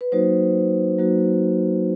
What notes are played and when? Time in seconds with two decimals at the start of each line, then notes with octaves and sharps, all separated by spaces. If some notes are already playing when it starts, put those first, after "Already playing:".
0.01 B4
0.12 F#3 A#3 D#4 F#4 C5
0.98 F#3 A#3 D#4 F#4